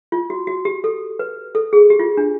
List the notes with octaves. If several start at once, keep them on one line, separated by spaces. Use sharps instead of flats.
F4
F#4
F#4
G4
A4
B4
A4
G#4
G4
F4
D4